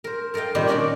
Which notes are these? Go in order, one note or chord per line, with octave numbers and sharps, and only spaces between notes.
A#4 C5
A4 A#4 D#5 F5 G5
A#2 D#3 G3 C4 G4
C#4 D4 F#4 A#4 D5 G5